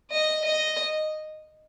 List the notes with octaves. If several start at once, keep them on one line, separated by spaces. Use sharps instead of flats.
D#5
D#5